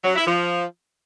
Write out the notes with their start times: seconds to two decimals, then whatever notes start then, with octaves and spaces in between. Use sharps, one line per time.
0.04 F#3
0.15 E4
0.26 F3